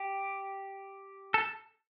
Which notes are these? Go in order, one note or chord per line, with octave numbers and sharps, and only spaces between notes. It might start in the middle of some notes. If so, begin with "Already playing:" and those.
Already playing: G4
A4